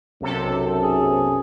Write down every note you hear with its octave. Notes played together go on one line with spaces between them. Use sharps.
B1 F#2 C3 A4
G#4